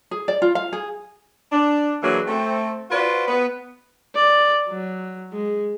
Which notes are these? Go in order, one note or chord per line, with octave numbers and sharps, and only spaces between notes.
G#4
D5
F4
F5
G#4
D4
D3 E3 F#3 A#3 G#4
A3 C4
F4 F#4 B4 C5 D5
B3 B4
D5
F#3
G#3